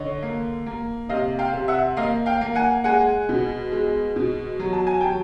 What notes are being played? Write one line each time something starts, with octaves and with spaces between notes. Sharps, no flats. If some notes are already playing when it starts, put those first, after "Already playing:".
Already playing: D3 C#5 D#5
A#3
A#3
C3 D#5 F5
F5 G5
C3
E5 F#5
A#3 D#5 F5
F5 G5
A#3
F#5 G#5
G#3 F#5 G#5
B2
G#3
B2
F#3
A5
G#5
F#3 G5 A5